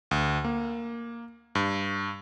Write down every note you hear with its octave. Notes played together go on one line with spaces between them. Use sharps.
D2
A#3
G2